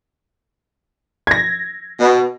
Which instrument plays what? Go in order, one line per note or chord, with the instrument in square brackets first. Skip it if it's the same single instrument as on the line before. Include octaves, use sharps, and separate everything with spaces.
[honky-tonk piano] G#6 A#6
[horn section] B2